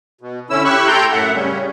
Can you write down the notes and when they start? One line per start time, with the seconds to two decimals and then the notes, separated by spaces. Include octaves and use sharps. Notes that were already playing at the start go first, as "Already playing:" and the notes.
0.21 B2
0.50 D3 C#4 E4 E6
0.65 E4 G4 C#6 E6 F#6
0.87 A3 A4 G5 A#5 C6 G6
1.12 F#2 A2 E5 F#5
1.34 C#3 G3 C#4